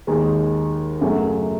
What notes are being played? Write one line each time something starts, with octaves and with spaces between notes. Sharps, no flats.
D#2 D#3 G#3
F#2 C#3 F#3 A3